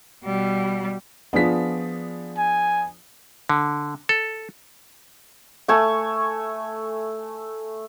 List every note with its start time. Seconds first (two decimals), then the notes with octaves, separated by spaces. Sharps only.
0.24 B2 G3
1.33 F3 B3 D4 G#4 B6
2.38 G#5
3.49 D3
4.09 A4
5.68 A3 G#5 C#6